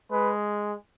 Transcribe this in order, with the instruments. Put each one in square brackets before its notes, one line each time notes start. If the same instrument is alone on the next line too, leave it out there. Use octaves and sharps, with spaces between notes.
[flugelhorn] G#3 [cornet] B4